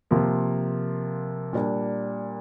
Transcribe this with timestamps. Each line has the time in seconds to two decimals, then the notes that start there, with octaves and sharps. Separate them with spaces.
0.11 C3 F3 A#3
1.53 A#2 G3 D4